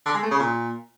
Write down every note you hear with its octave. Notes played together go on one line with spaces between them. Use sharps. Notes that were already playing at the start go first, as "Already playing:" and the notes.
D3
G#3
A3
C#3
A#2